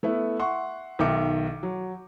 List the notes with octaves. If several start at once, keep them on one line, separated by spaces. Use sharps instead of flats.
A3 B3 E4
E5 F#5 C6 C#6
B1 D#3 E5 G5 D6 C#7
F#3